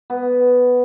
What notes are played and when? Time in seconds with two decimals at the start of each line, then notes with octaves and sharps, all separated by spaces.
0.10 B3